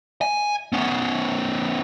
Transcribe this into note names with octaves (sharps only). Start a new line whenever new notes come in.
G#5
B3 C#4